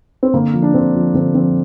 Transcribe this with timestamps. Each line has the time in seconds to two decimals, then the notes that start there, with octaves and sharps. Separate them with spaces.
0.23 C4
0.34 D3 A#3
0.53 F3
0.62 D4
0.74 D3 C4
0.95 F3
1.14 D3 C4
1.35 F3 C4